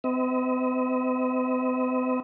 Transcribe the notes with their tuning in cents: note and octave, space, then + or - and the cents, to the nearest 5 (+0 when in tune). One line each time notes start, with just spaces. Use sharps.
C4 -45 D#5 +40